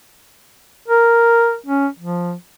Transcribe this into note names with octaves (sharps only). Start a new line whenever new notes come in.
A#4
C#4
F3